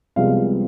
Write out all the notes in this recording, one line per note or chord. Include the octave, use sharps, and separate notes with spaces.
C2 C3 F3 G#3 B3 F5